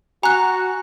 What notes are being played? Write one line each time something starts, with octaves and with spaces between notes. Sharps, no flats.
F#4 G#5 A#5 F#6